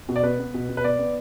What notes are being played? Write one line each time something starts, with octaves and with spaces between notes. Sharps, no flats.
B2
D5
B3 B4
B3
B2
B2
B4
B3 D5
B3